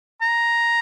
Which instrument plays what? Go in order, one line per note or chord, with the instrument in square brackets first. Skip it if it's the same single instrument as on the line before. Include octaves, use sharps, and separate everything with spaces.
[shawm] A#5